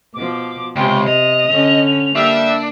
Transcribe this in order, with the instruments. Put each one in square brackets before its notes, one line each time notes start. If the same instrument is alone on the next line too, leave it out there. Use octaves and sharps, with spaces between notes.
[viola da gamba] B2 F3 [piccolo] D6
[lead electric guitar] C#2 [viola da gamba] C3 [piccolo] G5
[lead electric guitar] D#5 [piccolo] F7
[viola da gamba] D3 C#4
[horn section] G3 E5 [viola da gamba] A#3 [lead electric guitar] D4